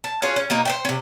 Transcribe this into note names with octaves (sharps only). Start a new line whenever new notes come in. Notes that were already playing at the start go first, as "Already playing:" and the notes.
A5
C#4 F4 F#4 G#4
C#4
B2 A#3 D#4
C5 E5 G5
C3 C#4